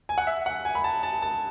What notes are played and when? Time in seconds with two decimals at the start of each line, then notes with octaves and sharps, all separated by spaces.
0.09 G#5
0.18 F#5
0.27 E5
0.46 F#5
0.65 G#5
0.75 B5
0.84 A5
1.03 A5
1.22 A5